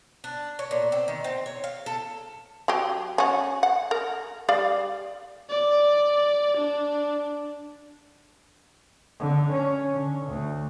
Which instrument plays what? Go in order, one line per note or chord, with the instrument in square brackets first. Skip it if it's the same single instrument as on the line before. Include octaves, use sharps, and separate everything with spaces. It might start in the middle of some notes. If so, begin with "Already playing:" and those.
[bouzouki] D4
C#5
A#2
C4
D#3
C4
C#5
F5
A4
[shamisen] F#3 G4
C#4 F#4
F#5
A#4
G3 D5 F5
[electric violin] D5
D4
[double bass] D3
C#4
D3
D2